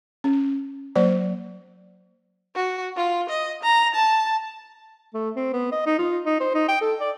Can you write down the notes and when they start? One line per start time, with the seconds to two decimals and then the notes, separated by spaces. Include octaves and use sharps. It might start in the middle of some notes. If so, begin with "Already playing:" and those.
0.24 C#4
0.96 F#3 A#3 C5 D5
2.55 F#4
2.96 F4
3.29 D#5
3.63 A#5
3.95 A5
5.14 A3
5.36 C4
5.53 B3
5.72 D#5
5.86 D#4
5.98 F4
6.25 D#4
6.40 C5
6.54 D#4
6.68 G5
6.81 A4
7.00 D5